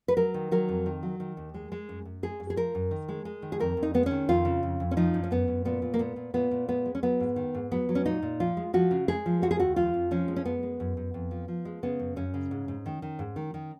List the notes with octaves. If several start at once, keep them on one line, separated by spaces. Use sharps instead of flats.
B4
F#3 A#4
D#3
F#3 A#4
F2
D#3
F#3
D#3
D#2
G#3
G#3
F#2
F#2
G#3 G#4
F#2
G#4
F3 A#4
F#2
D#3
G#3
G#3
D#3
G#4
F2 A#4
F2
D#4
G#3 B3
D#3 C#4
F2 F4
C#3
F2
F2
C#4
F3 D#4
F#2
C#4
F#2 B3
F#2
A#2 B3
A#2
A#3
A#2 B3
A#2
A#2 B3
A#2
G#3 B3
G#3
C#4
F#3 B3
G#2
D#3
G#2
F#3 B3
F#3
C#4
A#2 D#4
A#2
F3 F4
G#3
F3 F#4
C#3
G#3 G#4
F3
G#3 F#4
G#4
D#2 F#4
F3 F4
F2
F3 C#4
G#3
C#4
F#2 B3
G#3
F#2
F#2
F2
F3
F3
G#3
C#3 B3
F#2
F#2 C#4
C#3
G#2
G#2
D#3
D#3
G#2
D#3
D#3